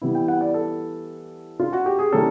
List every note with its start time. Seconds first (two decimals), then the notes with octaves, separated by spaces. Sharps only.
0.01 E3 G3 B3 E4
0.15 G5
0.28 F#5
0.41 D5
0.54 A4
1.60 F4
1.73 F#4
1.86 G4
1.99 G#4
2.12 E3 G3 A#3 C#4 A4